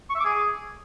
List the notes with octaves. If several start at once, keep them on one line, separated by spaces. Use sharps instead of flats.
C#6
E5
D6
G#4